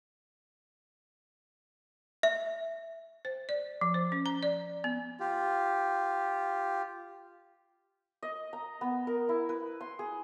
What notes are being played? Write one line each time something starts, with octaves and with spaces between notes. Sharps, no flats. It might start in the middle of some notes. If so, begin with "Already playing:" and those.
E5
C5
D5
F3
C5
C#4
A#5
D5
B3
F4 G4
D#5
A#5
B3
A#4
E4
B4
C6
G#4